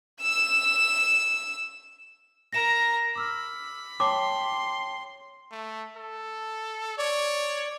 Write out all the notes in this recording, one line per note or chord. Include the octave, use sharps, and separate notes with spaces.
E6 E7
A#4 A#5 A#6 E7
B5 D6 E6 F6
C#5 G5 A5 C6 D6
A3
A4
C#5 D5